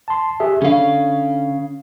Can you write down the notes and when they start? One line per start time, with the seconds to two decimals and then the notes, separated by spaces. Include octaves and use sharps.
0.08 A5 C6
0.40 G4 G#4 E5
0.62 D3 C#4 F5